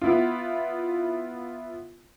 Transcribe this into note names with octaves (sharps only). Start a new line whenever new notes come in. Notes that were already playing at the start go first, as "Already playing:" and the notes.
B3 E4 F4